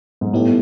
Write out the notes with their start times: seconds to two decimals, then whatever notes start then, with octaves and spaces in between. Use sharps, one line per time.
0.21 G#2
0.33 A2 G3 B3 D#4 G4